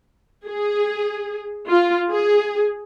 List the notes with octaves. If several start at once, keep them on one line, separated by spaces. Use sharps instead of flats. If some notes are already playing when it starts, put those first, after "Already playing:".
G#4
F4
G#4